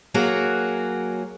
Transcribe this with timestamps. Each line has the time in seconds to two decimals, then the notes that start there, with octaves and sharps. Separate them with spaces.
0.14 F#3 A#3 F#4 G#4